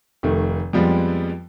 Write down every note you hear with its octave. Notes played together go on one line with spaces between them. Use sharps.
F1 D#3 A3
F2 F3 G3 G#3 B3